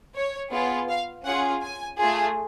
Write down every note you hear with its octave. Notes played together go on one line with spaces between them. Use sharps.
C#5
B3 F4 G#4
F5
C#4 F4 G#4 F#5
G#5
A3 F4 G#4